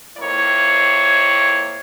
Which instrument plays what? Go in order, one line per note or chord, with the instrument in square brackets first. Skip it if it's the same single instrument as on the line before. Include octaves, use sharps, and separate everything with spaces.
[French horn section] F2 A#3 E4 C#5